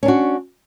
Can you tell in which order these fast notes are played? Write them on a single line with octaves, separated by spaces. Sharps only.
C#4 D4 F#4